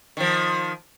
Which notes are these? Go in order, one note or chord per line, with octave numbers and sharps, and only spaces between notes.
D#3 F3